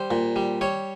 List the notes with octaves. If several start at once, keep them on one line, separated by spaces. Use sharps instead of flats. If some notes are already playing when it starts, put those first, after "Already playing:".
Already playing: G3 C5
A#2
G3
G3 C#5